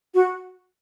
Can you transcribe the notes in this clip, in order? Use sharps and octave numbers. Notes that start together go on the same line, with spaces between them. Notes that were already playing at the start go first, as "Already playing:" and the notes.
F#4